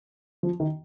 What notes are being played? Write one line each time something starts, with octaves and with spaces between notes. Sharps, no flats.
F3
D#3